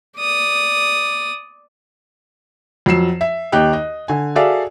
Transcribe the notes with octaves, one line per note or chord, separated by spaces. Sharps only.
D5 D#6
F2 F#3 C7 E7
E5
D#2 D#4 G4 G5 F#6
D#5
D3 G#5
F#4 G#4 A4 D5 E5 F5